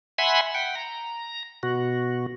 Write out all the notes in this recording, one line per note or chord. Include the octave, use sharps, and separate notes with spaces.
E5 F#5 G#5 B5 C6
F#5 G5
A#5
B2 F#4